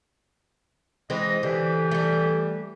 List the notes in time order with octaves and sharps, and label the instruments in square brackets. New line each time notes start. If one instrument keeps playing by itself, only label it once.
[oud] E3 G#3 C4 [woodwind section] D#5
[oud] D3 [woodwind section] E3 G4
[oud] G3 A3